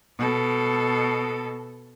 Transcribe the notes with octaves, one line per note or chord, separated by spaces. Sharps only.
B2 A4